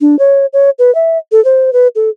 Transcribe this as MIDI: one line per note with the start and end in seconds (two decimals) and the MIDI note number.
0.01 0.18 62
0.19 0.46 73
0.53 0.70 73
0.79 0.93 71
0.95 1.18 76
1.32 1.43 69
1.45 1.73 72
1.73 1.88 71
1.96 2.10 69